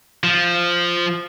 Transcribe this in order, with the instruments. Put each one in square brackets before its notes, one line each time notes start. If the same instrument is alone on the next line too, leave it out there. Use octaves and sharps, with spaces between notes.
[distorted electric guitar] F3